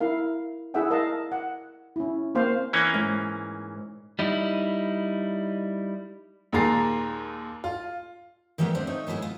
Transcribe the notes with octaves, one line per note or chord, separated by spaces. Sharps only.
E4 A#4 F5
E4 G#4 A4 E5 F#5 G5
A#4 D#5 F5 A5
F#5
C#4 E4
A#3 C4 C5 F5
E3 A#3 C#4
G#2
G3 D#4 E4
D#2 A#2 G#3 A#5 A6 C7
F4
D#3 E3 G3 G#3 B3
E2 C4 D4 E5
A3 D#4 C#5
D#3 G#3 B3 E4 G#4
F4